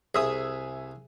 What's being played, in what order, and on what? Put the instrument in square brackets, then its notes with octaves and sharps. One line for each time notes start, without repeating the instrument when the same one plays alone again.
[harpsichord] C2 [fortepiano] G#4 E5 D#6